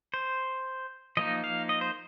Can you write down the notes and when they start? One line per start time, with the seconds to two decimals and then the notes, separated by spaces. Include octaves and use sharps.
0.14 C5
1.17 F3 A#3 D#4 D#5
1.44 F5
1.69 D#5
1.81 C5